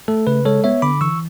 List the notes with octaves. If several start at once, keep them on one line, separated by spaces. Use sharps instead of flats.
A3 A4
C#3 B4
G#3 A4 C#5
B3 C#5 E5
D3 B5 D6
E3 C#6 E6